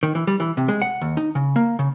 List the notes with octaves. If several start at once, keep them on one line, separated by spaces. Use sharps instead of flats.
D#3
E3
G3
E3
C3
G#3
F#5
D#2
D#4
C#3
A#3
C#3